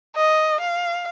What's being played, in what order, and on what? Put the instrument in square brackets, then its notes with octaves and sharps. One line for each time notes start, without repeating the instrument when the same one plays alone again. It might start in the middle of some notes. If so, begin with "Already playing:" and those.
[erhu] D#5
F5